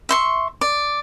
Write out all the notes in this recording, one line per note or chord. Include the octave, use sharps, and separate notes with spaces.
E5 C6 C#6
D5